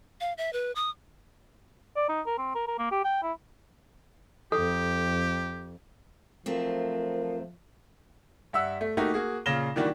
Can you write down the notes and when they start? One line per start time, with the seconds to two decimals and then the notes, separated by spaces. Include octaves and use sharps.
0.21 F5
0.38 E5
0.53 B4
0.76 D#6
1.96 D5
2.09 D#4
2.26 A#4
2.38 C4
2.55 A#4
2.68 A#4
2.79 A#3
2.91 G4
3.05 G5
3.23 E4
4.52 F2 G4 A4
6.46 F3 F#3 A3 C4 A#4
8.53 G2 E5 F#5 E6
8.81 A3
8.97 A3 A#3 D#4 F#4 G4
9.14 A#3 F#4 G#4
9.46 A#2 C#3 F5 A#6 E7 G7
9.76 D#3 E3 G3 A#3 D4 F#4